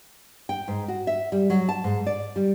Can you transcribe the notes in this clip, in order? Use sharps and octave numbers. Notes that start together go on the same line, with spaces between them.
G5
G#2
F#4
E5
G3
F#3
A5
G#2
D5
G3